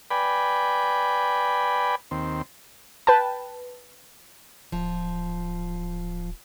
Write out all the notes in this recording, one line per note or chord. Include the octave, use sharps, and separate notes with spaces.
B4 D5 G5 G#5 B5
D#2 C4
B4 G5 A5
D1 F3